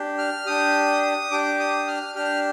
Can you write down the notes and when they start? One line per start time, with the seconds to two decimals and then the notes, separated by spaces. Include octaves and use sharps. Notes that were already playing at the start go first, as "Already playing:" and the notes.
Already playing: D4 G4
0.18 F6
0.46 D4 G4 D#6
1.31 D4 G4 D6
1.59 D#6
1.88 F6
2.15 D4 G4 F6